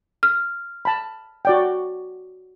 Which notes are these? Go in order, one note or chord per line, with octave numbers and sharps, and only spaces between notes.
F6
A5 B5
F#4 D5 G5